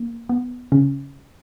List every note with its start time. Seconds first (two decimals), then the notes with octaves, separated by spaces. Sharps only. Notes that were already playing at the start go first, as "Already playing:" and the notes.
Already playing: A#3
0.29 B3
0.72 C#3 C#4